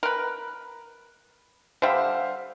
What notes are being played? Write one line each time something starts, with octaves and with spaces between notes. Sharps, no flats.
A#4 B4
D3 G3 C5 E5 F5